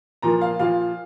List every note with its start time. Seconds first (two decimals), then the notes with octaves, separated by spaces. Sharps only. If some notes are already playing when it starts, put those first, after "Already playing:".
0.22 A#2 F3 A#3 A#5
0.41 F5
0.59 A#2 F3 A#3 F5